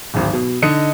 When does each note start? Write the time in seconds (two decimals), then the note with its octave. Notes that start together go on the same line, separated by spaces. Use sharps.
0.14 D1 G#1
0.33 B2
0.62 D3 D#4 D#5 D#6 C#7